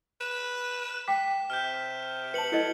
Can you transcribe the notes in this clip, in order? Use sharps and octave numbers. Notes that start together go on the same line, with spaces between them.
B4 E7
G5 D6 B6
C3 F6 G6
B4 A5 C#7 F#7
F#3 E4 A4 D#5